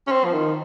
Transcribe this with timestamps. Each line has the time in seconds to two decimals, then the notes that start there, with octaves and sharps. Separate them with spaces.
0.07 C#4
0.11 C4
0.25 F3
0.33 D#3